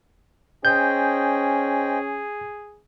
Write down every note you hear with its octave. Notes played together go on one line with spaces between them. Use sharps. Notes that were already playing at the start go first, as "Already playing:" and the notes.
C#4 G#4 C5 D#5 G5 G6